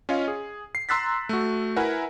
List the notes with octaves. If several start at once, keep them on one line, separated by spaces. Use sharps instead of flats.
C#4 F4 C#5 D#5 F5
G#4
C7
A#5 C6 E6 F#6 A6 B6
A3 F#4
E4 A#4 B4 E5 F#5 G#5